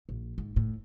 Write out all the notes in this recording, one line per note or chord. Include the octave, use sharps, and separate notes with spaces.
A#1
G#2
A2